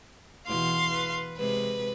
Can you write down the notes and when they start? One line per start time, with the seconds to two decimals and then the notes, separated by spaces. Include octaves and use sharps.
0.47 E2 B2 E3 F5 C6
0.94 B4
1.37 C3 G#3 B4